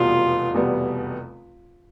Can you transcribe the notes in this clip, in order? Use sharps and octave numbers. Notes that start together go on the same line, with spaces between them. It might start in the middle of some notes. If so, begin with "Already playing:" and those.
Already playing: F1 E2 B2 G3 B3 F4
F1 E2 B2 G3 B3